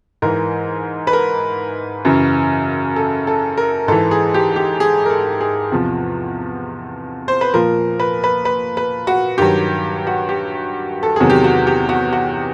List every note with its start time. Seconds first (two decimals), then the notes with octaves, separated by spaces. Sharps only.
0.22 G#2 E3 A#4
1.07 B4
1.13 A#4
2.05 F#2 C#3 E3
2.96 A4
3.27 A4
3.57 A#4
3.88 G#2 E3 A4
4.11 G#4
4.34 G4
4.56 G4
4.80 G#4
5.06 A#4
5.10 A4
5.41 G#4
5.72 E2 C3 F3
7.28 C5
7.41 B4
7.54 A#2 F3 A#4
8.00 B4
8.24 B4
8.45 B4
8.77 B4
9.07 F#4
9.38 G2 D#3 F#3 G4
10.07 F#4
10.29 G4
11.03 A4
11.16 E2 C3 D#3 F#3 G#4
11.30 G4
11.44 F#4
11.67 G4
11.89 F#4
12.13 F#4